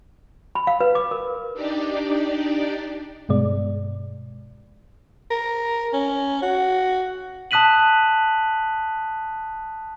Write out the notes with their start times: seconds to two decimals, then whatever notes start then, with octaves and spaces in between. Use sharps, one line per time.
0.55 B5
0.67 F5
0.80 B4
0.95 D6
1.11 A#4
1.54 D4 D#4 G4 D5
3.29 G2 B2 G#3 D5
5.31 A#4
5.93 C#4
6.42 F#4
7.51 A5 D#6 F#6 B6 D#7 F#7